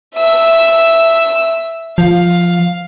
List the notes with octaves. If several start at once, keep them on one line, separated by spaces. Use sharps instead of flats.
E5 E6
F3 F5